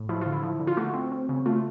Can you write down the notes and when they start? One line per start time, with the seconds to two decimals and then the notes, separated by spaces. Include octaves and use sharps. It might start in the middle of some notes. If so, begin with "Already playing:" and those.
Already playing: A2
0.09 F3 E4
0.21 D3 F4
0.32 E4
0.43 F3
0.60 D3
0.67 F4
0.77 A3 F#4
0.94 C4
1.12 C4
1.29 C#3
1.46 A3 F4